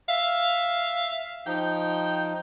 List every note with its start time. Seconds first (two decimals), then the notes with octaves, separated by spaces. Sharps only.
0.09 E5 F5
1.47 F3 D#4 G5